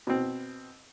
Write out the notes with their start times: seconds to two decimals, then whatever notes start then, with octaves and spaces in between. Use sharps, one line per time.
0.07 B2 C4